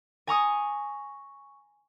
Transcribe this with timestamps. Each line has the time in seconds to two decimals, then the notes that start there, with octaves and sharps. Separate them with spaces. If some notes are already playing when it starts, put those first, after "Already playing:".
0.27 G#5 A#5 C#6 D#6